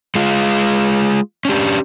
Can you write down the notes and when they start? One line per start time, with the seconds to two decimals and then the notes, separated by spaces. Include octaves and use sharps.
0.15 G#3 F4
1.45 C#4 D4 G4